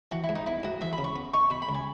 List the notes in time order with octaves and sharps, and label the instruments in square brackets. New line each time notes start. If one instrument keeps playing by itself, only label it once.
[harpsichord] E3 [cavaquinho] F#4
[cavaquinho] E4
[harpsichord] G#2
[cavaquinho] D#4
[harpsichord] B3 [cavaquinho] E4
[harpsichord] G#2 [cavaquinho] F#4
[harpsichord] E3 [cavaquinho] E5
[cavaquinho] B5
[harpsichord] C#3
[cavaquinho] C#6
[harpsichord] B3
[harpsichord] D#4 [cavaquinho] C#6
[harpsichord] B2 [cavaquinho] B5
[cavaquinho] B5
[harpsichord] C#2
[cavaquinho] G#5